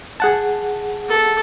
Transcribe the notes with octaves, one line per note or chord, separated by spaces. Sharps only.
G#4 F#5 A5
A4